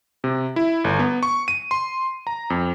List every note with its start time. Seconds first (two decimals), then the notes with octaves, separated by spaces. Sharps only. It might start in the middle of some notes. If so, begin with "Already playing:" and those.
0.24 C3
0.56 E4
0.84 G1
0.99 B3
1.23 C#6
1.48 D#7
1.71 C6
2.27 A#5
2.50 F2